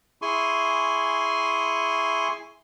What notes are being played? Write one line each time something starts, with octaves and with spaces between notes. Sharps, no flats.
E4 G#4 G#5 C6 C#6